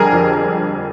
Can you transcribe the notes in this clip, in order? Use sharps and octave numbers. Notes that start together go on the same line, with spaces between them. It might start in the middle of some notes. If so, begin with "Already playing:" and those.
Already playing: F2 D3 G3 G#4 A#4
F2